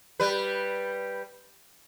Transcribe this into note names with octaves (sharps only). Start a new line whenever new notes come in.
G3 B4